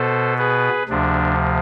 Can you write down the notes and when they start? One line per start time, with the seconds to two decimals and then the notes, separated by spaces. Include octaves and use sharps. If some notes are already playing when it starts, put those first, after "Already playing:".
Already playing: B2 B3 A4 C5
0.38 G#4 B4
0.89 D2 C3 F3 D4